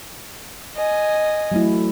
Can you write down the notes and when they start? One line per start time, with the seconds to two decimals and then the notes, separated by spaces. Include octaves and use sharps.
0.75 D#5 G#5
1.52 F#3 A3 E4